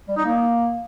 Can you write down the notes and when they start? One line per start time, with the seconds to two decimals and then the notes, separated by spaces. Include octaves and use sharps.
0.08 G3
0.17 D#4
0.25 A#3